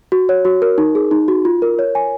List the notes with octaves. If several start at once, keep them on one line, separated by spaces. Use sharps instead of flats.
F#4
C#5
F#4
A#4
D#4
G#4
D#4
F#4
F4
A#4
C#5
G#5